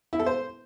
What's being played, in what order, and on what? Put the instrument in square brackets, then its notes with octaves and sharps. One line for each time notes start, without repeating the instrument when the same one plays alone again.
[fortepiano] E4
A4
C5